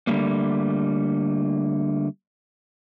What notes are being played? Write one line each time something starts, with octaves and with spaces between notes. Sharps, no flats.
D3 G3 A3 A#3